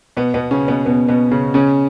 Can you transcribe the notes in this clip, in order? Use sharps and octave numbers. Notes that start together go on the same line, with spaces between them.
B2 B3
B2 B3
C#3 C#4
B2 B3
B2 B3
B2 B3
C#3 C#4
C#3 C#4